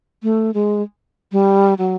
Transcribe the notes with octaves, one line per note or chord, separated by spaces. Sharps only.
A3
G#3
G3
F#3